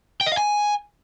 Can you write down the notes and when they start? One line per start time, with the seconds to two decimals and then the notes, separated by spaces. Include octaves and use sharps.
0.21 G5
0.26 D#5
0.32 F5
0.37 G#5